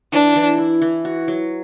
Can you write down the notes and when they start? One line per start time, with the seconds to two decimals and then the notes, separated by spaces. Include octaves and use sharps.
0.12 E3 D4
0.35 E3
0.58 E4
0.82 E3
1.05 F#4
1.28 F#3